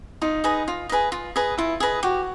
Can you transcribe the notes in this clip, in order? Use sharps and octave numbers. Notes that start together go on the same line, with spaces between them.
D#4 F4
G#4 B4 D#5
F4
G#4 B4 D#5
F4
G#4 B4 D#5
E4 F4
G#4 B4 D#5
F#4 G4